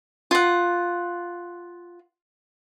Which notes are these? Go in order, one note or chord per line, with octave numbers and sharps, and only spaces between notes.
F4 F#5